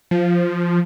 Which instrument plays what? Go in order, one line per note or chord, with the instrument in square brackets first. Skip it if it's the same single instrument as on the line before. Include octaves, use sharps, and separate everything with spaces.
[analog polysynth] F3